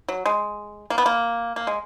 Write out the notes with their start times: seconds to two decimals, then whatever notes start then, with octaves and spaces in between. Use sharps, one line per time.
0.08 F#3
0.25 G#3
0.90 A#3
0.98 B3
1.06 A#3
1.56 A#3
1.67 G#3